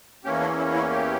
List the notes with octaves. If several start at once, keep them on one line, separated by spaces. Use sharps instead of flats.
E2 E3 A#3 C#4 G4
D4
E4
E4
G4